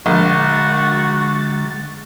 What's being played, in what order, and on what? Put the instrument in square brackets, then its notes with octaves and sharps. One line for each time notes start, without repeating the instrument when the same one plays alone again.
[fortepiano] A#1 [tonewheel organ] D3 G#3 A6 [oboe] F#4